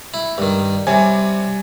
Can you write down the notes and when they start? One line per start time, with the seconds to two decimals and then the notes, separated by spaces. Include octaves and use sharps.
0.14 E4
0.38 G2 D#3
0.87 C3 G3 C#5 G#5